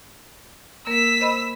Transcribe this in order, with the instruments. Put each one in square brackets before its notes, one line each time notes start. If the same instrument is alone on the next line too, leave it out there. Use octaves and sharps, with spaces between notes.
[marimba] A#3 A#4 [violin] E6 B6
[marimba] C5 D#5 B5